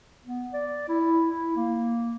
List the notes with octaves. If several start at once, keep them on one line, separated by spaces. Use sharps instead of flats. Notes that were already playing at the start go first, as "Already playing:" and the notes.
B3
D5
E4
E4
A#3